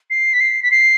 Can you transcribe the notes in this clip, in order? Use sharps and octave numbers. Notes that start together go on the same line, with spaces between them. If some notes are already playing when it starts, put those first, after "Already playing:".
C7
B6
C7
B6
C7